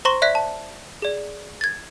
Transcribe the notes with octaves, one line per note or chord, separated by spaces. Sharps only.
C5 A#5 C6 C#6 A#6 G7
D5 E5 F#6 B6
A5
G#4 D5
G#6 A6